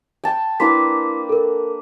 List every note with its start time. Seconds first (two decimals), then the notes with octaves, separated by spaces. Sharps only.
0.24 G5 A5
0.60 A#3 D4 E4 B4 C6 B6
1.29 A4 A#4